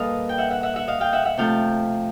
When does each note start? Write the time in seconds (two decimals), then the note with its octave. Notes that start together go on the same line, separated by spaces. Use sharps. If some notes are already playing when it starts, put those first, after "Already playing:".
Already playing: A#2 G3 A4 B4 D#5 F5
0.29 G5
0.38 E5 F#5
0.50 E5 F#5
0.63 E5 F#5
0.76 E5 F#5
0.87 D#5 F5
1.00 F5 G5
1.13 E5 F#5
1.25 E5 F#5
1.37 C3 F3 A3 F5 G5